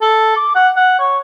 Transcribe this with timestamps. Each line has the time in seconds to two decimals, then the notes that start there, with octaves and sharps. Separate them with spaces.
0.02 A4
0.36 D6
0.55 F#5
0.76 F#5
0.99 C#5